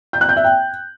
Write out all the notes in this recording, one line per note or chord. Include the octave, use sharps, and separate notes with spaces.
G6
F#6
G6
E5
G5